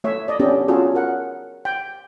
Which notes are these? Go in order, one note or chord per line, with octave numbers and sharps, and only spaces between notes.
A3 C#5 E5
D5 D#5
B3 C#4 D4 G4 A4
C#4 F4 F#4 G#4 A4
A#4 F#5
G5